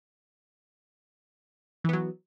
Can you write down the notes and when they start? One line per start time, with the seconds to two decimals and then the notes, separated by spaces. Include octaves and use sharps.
1.84 E3
1.89 B3
1.93 F#3